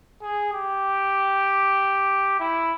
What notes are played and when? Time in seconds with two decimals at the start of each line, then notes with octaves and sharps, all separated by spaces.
0.22 G#4
0.53 G4
2.40 E4